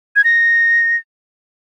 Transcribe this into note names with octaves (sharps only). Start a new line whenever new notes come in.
G#6
A#6